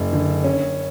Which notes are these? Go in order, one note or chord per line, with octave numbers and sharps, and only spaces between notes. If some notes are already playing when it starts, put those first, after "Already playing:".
Already playing: F#1
D3
C#4